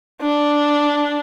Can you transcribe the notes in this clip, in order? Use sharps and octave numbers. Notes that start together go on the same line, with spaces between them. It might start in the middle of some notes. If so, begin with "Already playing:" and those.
D4